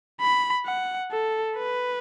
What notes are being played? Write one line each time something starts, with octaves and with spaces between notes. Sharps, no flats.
B5
F#5
A4
B4